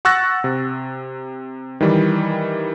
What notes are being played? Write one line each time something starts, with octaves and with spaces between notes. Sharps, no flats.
F#5 C#6 E6 F#6 A6 A#6
C3
D#3 E3 G3